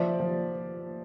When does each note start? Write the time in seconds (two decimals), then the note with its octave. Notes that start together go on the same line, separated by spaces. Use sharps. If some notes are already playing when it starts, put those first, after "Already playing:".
Already playing: F3 D5 E5
0.20 F3